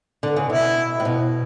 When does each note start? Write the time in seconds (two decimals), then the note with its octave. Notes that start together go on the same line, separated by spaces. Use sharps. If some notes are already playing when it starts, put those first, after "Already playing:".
0.23 D3
0.36 C#3
0.50 B2 E4
1.00 A2
1.05 B2